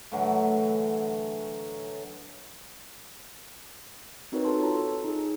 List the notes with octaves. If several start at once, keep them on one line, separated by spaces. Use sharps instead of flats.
A2 D3 E3 F#3
C4 D#4 F#4 A#4 B4 C#5
F#4 A4 A#4 A5 C6
F4 C#5 A#5
A4
D#4 G#4